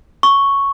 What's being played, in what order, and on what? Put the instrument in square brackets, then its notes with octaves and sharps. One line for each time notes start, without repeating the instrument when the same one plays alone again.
[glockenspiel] C#6